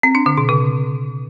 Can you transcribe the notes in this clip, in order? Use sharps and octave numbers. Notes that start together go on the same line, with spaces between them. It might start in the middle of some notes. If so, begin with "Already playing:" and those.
C4
D4
D3
B2
C#3